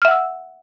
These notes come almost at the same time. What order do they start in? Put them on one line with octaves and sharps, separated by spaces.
F6 E5 F#5 E6